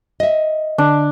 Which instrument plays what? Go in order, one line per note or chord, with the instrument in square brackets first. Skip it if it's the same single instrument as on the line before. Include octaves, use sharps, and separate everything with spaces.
[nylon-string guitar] D#5 E5
[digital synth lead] D3 [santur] D4